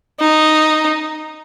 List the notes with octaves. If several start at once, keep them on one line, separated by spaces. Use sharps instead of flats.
D#4